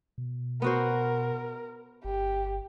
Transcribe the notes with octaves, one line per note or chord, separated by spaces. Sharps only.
B2
B3 F#4 A#4 C5
G1 G4